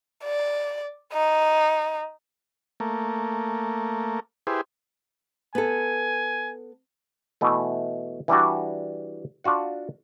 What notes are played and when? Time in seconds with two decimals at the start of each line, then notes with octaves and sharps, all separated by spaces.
0.24 D5
1.13 D#4
2.80 A3 A#3
4.47 E4 G4 G#4 B4 C5
5.55 B3 A4 G#5
7.41 B2 E3 A3
8.28 E3 G3 D4 F#4
9.44 D4 F4 F#4 F#5